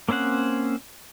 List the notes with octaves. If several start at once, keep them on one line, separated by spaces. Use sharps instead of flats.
A#3 C4 C#4 C5 F#5